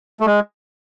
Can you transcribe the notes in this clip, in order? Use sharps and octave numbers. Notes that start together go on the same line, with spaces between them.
A3
G#3